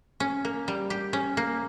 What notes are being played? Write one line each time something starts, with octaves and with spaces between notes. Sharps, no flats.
C#4
A#3
G3
G4
C#4
A#3